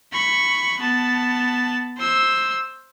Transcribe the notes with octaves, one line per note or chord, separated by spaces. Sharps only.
B5 C#6
B3 A5
C5 E6